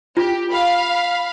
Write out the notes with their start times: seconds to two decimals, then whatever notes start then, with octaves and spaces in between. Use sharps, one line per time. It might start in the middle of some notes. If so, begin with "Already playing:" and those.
0.17 F4 G4
0.50 F5 B5